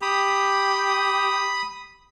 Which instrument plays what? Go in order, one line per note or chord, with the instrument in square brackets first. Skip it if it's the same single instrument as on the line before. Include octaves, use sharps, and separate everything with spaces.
[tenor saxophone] G4 [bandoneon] B5 D#6